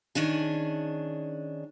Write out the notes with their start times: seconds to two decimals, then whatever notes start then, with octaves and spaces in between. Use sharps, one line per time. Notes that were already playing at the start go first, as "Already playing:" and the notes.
0.15 D#3 C#4 D4 G#4